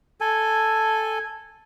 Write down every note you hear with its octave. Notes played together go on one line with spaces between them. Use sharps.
A4 G#5